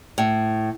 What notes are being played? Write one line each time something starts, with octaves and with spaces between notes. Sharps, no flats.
A2